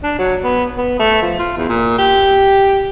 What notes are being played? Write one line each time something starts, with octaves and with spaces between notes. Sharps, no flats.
D4
F#3
B3
B3
A3
F3
F4
E2
A#2
G4